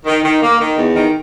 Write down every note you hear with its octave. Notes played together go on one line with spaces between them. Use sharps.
D#3
D#3
A#3
D#3
E2
D#3